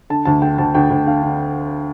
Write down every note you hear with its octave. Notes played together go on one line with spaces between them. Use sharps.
D3 A5
D2 A5
D3 G5
D2 A5
D2 G5
D2
D3 F5
D3